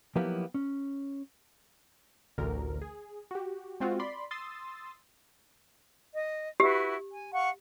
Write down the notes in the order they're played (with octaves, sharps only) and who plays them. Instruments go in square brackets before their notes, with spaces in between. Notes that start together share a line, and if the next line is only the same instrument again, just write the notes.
[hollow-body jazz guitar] F3 F#3 A#3 B3 E4 G4
C#4
[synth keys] A1 D2 A#4
G#4
F#4 G4
G#3 C4 F4 F#4
D5 B5 C6
C6 D#6 E6 A6
[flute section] D#5
[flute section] E4 F#4 B4 [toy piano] G4
[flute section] G#5
F5 F#5 C#6